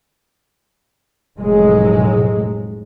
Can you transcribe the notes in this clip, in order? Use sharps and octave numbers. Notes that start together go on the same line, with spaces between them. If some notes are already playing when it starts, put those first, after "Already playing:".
F1 A2 F#3 G#3